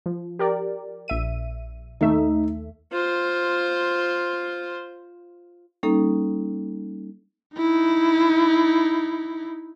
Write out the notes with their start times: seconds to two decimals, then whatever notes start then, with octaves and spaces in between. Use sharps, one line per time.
0.06 F3
0.39 G4 A#4 D5
1.08 A#1 E5 D#7
2.01 D#2 A3 D#4 E5
2.92 F4 C5
5.83 G3 A#3 C#4 D#4 A4
7.57 D#4 E4